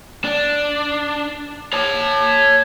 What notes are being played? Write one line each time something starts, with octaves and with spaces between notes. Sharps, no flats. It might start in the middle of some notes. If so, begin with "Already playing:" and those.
D4
C#5 A5